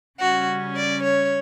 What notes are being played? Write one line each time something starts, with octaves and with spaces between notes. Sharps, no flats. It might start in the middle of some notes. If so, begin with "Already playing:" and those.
C#3 G3 C#4 F#4
D5
C#5